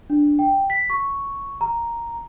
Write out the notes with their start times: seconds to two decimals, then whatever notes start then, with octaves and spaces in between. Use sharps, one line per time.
0.10 D4
0.39 G5
0.70 B6
0.90 C#6
1.61 A#5